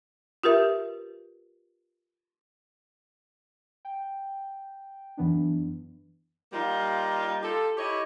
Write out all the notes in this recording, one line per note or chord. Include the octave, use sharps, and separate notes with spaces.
F4 G4 A#4 B4 E5
G5
F#2 E3 B3 D4
G3 A#3 D#4 F4
F4 G4 A4
E4 G4 C#5 D#5